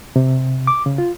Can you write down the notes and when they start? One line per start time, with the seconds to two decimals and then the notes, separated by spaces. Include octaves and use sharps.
0.16 C3
0.67 D6
0.86 C#3
0.98 F4